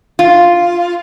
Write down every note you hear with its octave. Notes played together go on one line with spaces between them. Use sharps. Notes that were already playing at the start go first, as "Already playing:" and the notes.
F4